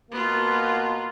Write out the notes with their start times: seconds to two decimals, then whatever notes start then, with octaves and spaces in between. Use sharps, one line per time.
0.11 B2 A#3 B3 F4